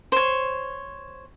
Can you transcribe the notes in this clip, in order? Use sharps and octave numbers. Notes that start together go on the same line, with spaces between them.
C5 C#5